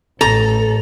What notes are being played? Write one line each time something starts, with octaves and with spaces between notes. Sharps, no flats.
A1 A4 A#5